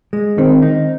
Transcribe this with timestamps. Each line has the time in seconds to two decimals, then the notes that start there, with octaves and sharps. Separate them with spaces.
0.13 G#3
0.38 D#3 C4
0.62 D#4